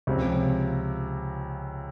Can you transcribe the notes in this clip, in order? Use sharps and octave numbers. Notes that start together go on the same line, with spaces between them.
C#2 C3 F3